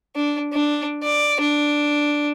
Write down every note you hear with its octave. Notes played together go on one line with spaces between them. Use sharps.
D4
D4
D5
D4